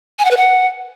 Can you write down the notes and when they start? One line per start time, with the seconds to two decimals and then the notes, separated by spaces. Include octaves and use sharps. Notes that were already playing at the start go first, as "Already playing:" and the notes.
0.19 G#5
0.25 F#5
0.31 B4
0.37 F#5